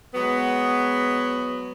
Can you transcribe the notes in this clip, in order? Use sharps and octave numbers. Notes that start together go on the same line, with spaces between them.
F#3 G#3 B3